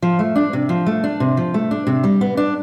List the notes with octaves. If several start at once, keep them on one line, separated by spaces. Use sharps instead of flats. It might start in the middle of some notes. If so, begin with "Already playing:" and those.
F3
A3
D4
C3
F3
A3
D4
C3
F3
A3
D4
C3
G3
B3
D4